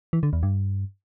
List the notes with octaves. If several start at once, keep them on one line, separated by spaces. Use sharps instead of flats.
E3
D3
E2
G2